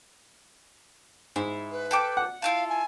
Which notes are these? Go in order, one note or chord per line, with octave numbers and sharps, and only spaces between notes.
G#2 E4
B4
A4 G5 D6
F#5
E4 F4 A4 F5
G#5